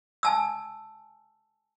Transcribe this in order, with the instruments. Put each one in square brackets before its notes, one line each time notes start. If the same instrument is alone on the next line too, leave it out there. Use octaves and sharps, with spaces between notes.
[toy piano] G#5 A5 E6